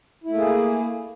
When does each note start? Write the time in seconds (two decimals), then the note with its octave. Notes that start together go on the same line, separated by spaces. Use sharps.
0.24 E4
0.29 A3
0.34 A#3
0.39 G#4